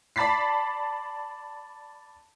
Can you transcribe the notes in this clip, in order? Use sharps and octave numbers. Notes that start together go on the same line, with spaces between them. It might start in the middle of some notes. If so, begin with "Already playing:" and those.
D5 A5 B5 A6 B6 C7